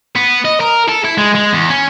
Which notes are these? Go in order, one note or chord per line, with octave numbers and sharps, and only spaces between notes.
B3
D#5
A#4
A4
E4
G#3
G#3
E2
C#4